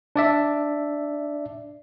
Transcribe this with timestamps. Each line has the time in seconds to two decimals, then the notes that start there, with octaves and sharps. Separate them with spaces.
0.16 D4 D5 E5